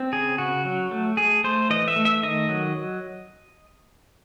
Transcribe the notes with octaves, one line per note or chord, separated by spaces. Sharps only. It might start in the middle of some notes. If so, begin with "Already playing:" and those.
Already playing: C4
C#3 G#4
C#3 F#4
F#3
A3
A3 G#4
A3 C5
E3 D#5
E5
A3
E5
D#3 D#5
F#3